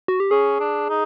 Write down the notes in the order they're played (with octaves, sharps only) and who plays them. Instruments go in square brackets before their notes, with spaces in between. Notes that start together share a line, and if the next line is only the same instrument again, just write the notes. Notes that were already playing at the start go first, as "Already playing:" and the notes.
[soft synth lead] F#4
G4
[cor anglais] C#4 [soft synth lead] G#4
[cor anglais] D4
D#4